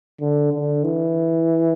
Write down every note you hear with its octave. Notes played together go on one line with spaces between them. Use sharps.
D3
D3
E3